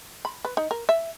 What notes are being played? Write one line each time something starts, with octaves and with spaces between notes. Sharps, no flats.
B5
B4
D#4
A#4
E5